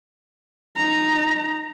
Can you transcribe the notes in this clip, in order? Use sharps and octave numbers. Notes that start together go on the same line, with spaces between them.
D#4 A#5